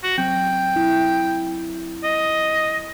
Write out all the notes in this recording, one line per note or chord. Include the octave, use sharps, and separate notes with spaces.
F#4
F#3 C4 G5
E4
D#5